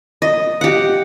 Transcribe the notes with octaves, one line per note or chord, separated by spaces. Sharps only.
D#5
G4 F#5